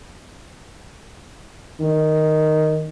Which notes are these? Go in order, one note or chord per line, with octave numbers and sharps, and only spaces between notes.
D#3